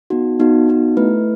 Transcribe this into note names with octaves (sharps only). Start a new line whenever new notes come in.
B3 D#4 F#4
B3 D#4 F#4
B3 D#4 F#4
A3 E4 B4